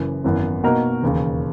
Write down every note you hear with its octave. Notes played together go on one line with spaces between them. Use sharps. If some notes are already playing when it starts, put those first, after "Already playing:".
Already playing: F#1 F#2 E3
G#1 F#2 E3 B3
B2 A#3 D#4 F#4 A#4
E1 D#2 C#3